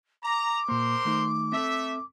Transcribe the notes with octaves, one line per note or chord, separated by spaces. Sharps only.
A#5 D6
A#2 A#3 A#4 C5 C6
D#3 A3 D#4
A3 C4 A4 E5